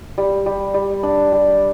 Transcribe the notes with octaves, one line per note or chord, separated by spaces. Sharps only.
G3
G3
G3
D4
G3